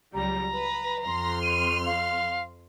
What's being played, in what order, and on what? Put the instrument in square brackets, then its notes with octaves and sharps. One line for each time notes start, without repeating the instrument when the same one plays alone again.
[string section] C#2 F#3 G3 [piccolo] A#5
[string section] B4
F2 C6 F6
[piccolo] D#7
F5